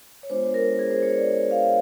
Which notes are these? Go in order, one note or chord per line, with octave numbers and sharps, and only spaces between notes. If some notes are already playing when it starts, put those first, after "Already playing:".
C#5
G#3 B3 D4 F4 C5
A#4
G#4
C5
C#5
D5
F5